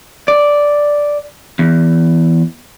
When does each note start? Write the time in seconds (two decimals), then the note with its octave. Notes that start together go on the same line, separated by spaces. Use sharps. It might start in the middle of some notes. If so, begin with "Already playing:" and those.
0.28 D5
1.59 E2